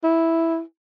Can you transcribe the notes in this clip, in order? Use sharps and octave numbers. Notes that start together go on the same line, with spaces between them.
E4